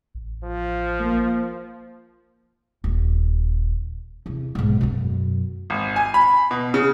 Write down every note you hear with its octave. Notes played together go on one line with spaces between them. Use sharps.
A1
F3
A#3
D#1
E2 C3
B1 G#2
F#2 B2
G#1
G#5
B5
B2
C#3